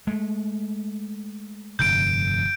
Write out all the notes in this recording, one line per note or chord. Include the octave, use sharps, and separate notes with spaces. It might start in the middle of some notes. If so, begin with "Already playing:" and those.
G#3 A3
F1 G2 D3 G6 D7